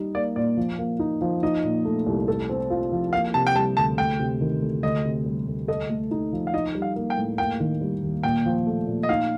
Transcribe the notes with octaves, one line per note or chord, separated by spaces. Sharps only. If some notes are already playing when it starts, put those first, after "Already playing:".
Already playing: G3 D#4
A#3 D5
A#2 D5
F3
A#3
D#4
F3
D#4 D#5
A#2
A3
C2
A4
C4
F4
F3
A#3 F5
C3 A5
G5
G3 A5
D2 A5
D2 G5
C3
D#3
D2
D2 D#5
C3
G3
D2
A4 D#5
A3
D#4
F3
F5
D#4 D#5
G3
F5
A#3
G5
A2
A#3 G5
D#3
G3
D#2
A#2 G5
F3
A3
A#2
D#5
D#4 F5